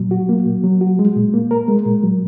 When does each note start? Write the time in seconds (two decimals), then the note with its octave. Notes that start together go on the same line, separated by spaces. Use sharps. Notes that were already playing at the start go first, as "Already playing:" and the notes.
Already playing: A#2 F#3
0.11 F#4
0.29 A#3
0.45 A#2
0.63 F#3
0.81 F#4
0.99 G#3
1.16 A#2
1.34 A#3
1.51 A#4
1.68 G#3
1.86 A#2
2.03 F#3